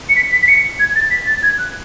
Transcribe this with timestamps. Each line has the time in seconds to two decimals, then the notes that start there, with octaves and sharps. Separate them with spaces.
0.09 C#7
0.16 B6
0.32 B6
0.42 B6
0.48 C#7
0.80 G#6
0.96 A6
1.10 B6
1.26 A6
1.43 G#6
1.59 F#6